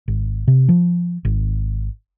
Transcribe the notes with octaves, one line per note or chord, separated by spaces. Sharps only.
G#1
C3
F3
G#1